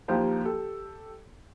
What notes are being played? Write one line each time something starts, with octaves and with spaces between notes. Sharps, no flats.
D#2 F3 A#3 G4 C5 A5
G4 A4